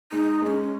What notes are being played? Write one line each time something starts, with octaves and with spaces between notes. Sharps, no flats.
G#3 D#4
G#3 C#4 D#4